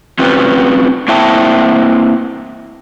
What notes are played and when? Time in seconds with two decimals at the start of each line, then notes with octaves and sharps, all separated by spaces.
0.19 C4 C#4 F4 G4 B4
1.08 A#3 C4 E4 E5 G5 A5